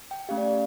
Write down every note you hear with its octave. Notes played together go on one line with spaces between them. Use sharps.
G5
A3 C#4 G4 F5
D5